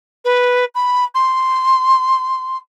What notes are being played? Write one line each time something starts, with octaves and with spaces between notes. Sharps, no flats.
B4
B5
C6